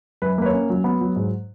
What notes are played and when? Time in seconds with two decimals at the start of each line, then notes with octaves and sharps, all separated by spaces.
0.22 F#2 B4
0.38 A#3 B4
0.46 C#5
0.53 C#4
0.70 F#3
0.84 B3
1.01 F#3
1.16 G#2